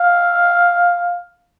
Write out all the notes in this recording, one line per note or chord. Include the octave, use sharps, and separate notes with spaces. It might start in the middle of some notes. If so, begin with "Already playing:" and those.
Already playing: F5